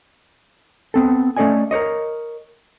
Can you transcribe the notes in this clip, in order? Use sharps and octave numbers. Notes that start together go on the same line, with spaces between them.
B3 C4 A4
A3 C#4 A4 D5 D#5 G#5
A#4 C5 C#5 D#5